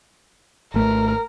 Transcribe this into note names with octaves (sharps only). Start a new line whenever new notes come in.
G#1 A3 A#4